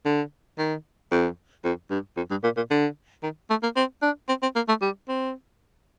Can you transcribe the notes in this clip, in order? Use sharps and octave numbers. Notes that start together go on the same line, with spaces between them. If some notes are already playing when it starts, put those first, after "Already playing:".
D3
D#3
F2
F2
G2
F2
G2
A#2
A#2
D3
D#3
A3
A#3
C4
D4
C4
C4
A#3
A3
G3
C4